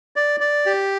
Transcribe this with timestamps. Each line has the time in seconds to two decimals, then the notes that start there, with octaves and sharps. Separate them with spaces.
0.16 D5
0.40 D5
0.66 G4